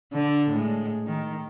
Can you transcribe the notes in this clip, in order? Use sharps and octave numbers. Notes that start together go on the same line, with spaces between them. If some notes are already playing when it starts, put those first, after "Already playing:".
D3
A2 G#3
D#3